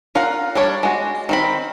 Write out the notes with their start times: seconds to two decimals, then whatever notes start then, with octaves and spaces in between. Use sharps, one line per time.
0.15 F4 A#4 F5 F#5
0.55 G3 D4 C#5
0.83 G#3 F#4
1.29 D#3 C4 B5